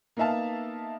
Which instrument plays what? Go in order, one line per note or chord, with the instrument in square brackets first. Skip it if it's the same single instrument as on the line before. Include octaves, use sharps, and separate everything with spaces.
[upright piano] A#3 B3 D#4 E5 F5 A5